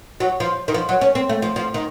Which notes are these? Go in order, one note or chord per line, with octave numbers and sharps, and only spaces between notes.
F#3
F3
D#3
F3
F#3
C#4
C4
A3
F3
F3
D#3